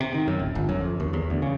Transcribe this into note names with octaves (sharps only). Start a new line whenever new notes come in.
C3
D#3
F#2
D1
G1
F#2
F2
D#2
E2
D2
C#3